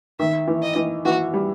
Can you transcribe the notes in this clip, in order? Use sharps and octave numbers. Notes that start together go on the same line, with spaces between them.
D#3 E5
E3
D#5
E3
E3 F#4
G3